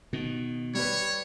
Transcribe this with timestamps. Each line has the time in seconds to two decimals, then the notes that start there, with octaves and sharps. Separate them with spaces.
0.13 B2 D#3
0.75 G3 B4 C#5